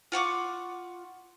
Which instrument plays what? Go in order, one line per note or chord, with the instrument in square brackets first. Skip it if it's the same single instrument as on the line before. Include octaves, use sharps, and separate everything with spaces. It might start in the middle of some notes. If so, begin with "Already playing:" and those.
[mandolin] F4 F#5 C#6 D6